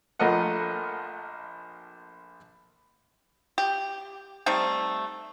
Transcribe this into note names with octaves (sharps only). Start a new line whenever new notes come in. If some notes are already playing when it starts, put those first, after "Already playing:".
A#1 F3 A3 A#4 D#5 F#5
G4
G3 A3 C4 D#4